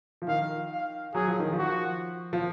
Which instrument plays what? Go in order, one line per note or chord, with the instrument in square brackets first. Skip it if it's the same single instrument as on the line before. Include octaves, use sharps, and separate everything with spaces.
[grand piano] F3
[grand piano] D#3 [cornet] F5
[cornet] F5
[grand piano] F#3 [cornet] G#4
[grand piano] F3
D#3
F3
[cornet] F#4
[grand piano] F3